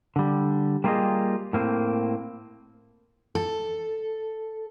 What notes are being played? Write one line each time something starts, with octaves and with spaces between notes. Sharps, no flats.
D3 G3
G3 A#3 F4 G4 G#4 D#5
A2 A#3 C4
A4